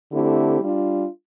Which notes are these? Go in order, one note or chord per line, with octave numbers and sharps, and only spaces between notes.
D3 A3 C4 E4 G4
G3 D4 F4